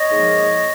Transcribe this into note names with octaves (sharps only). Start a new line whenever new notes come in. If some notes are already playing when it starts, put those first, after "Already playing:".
Already playing: C#5 D#5
G#2 F3 A#3